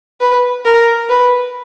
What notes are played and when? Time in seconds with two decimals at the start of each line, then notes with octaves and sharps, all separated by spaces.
0.21 B4
0.65 A#4
1.09 B4